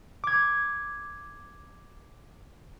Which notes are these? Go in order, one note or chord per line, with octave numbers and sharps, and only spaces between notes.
D6 G#6